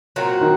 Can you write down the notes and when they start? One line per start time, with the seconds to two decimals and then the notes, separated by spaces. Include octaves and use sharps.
0.16 A#2 F#3 C4 F#4
0.41 D#3